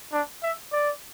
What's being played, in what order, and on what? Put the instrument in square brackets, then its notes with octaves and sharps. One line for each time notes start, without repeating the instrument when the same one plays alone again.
[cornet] D4
E5
D5